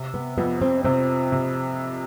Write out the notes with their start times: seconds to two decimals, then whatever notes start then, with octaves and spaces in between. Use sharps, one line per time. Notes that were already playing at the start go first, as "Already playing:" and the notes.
Already playing: C3
0.14 B3
0.38 F2 B3
0.62 C4
0.85 C3 C4
1.32 C3